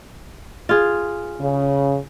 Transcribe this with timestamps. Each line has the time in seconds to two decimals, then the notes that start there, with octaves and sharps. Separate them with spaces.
0.69 F4 G#4
1.40 C#3